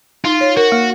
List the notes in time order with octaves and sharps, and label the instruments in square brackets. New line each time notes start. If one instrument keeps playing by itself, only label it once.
[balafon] D#4 [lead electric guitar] F4
[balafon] C#5
[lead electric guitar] F#4 [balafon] A#4
[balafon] A#3